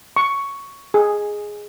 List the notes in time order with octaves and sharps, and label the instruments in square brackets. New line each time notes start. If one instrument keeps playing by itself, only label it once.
[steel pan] C#6
G#4